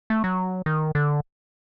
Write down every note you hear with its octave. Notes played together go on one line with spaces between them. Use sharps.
A3
F#3
D#3
D3